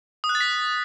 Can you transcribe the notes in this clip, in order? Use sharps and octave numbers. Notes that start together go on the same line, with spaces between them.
D#6
F#6
A6
B6